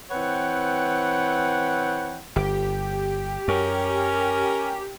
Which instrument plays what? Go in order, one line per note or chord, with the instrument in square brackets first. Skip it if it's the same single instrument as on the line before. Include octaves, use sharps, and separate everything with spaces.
[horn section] E3 C4 B4 C#5 F#5 G5
[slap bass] G1 [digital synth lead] G4
[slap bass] F#2 [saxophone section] C#4 A#4